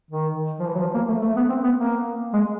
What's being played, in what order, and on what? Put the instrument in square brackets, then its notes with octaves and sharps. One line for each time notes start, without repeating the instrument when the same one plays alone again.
[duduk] D#3
F3
E3
F#3
F3
A#3
A3
A3
B3
C4
B3
A#3
G#3